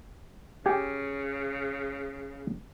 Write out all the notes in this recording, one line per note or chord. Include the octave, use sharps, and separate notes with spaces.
C#3 G4 G#5